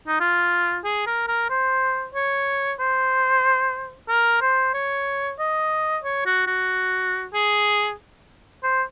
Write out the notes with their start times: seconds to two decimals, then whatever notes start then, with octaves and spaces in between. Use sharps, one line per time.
0.07 D#4
0.20 F4
0.84 G#4
1.07 A#4
1.28 A#4
1.49 C5
2.14 C#5
2.79 C5
4.09 A#4
4.41 C5
4.74 C#5
5.39 D#5
6.03 C#5
6.26 F#4
6.47 F#4
7.34 G#4
8.63 C5